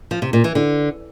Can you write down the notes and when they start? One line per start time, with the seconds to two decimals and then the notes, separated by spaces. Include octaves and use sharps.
0.11 F3
0.22 C3
0.33 A#2
0.44 E3
0.55 D3